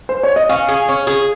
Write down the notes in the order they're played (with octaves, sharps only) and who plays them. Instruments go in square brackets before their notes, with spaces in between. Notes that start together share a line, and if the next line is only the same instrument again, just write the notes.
[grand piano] C5
C#5
D#5
[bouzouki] C#4 [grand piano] F5
[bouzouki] G#4
C#4
G#4